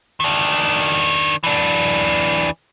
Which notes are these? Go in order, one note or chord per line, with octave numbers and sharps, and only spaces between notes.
D#3 D4
E3 D4